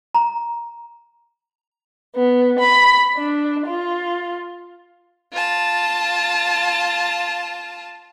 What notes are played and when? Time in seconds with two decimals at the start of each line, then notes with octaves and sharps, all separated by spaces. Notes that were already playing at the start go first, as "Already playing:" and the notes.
0.15 A#5
2.13 B3
2.58 B5
3.15 D4
3.66 F4
5.33 F4 A5